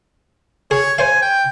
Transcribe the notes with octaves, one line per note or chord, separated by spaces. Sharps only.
G#4 C#5
C5 C#5 F5 G#5
G5